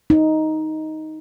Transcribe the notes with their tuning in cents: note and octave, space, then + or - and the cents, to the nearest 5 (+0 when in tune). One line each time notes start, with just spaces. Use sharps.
D#4 +5